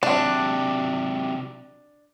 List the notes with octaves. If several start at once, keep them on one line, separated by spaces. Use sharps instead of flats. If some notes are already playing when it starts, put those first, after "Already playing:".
C3 F#3 D4